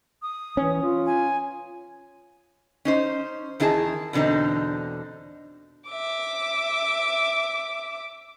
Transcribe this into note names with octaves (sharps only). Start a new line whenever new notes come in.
D#6
E3 C#4
F4
G#5
C#4 D#4 C5
E2 D#3 E4 G#4 A5
E2 B2 D3 C4 D#4
E5 D6